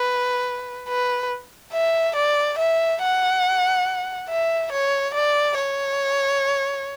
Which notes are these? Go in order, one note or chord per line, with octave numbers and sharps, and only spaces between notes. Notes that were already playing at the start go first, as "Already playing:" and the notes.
Already playing: B4
B4
E5
D5
E5
F#5
E5
C#5
D5
C#5